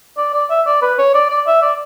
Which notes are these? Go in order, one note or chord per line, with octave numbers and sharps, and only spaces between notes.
D5
D5
E5
D5
B4
C#5
D5
D5
E5
D5